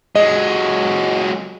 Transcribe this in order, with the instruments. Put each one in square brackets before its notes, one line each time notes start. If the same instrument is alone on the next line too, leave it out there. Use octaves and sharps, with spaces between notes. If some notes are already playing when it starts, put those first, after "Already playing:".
[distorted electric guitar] F#3 G#3 [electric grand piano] D#5